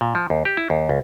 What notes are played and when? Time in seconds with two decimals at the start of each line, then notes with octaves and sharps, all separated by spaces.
0.01 A#2
0.15 F3
0.30 D#2
0.45 G4
0.57 E4
0.70 D#2
0.89 C#2